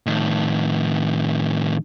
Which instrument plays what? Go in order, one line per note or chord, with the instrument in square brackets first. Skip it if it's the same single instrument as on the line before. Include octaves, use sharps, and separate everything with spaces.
[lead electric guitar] A2 D#3